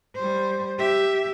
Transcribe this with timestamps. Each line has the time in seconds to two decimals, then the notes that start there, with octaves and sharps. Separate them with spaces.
0.15 G3 C5
0.79 G4 E5